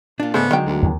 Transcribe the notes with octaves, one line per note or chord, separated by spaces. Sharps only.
A#2 D4 F4
G#2 C#3 A3 B3 D4 G#4 C5
D3 D#3 F#3 G#3 G5
D2
D#2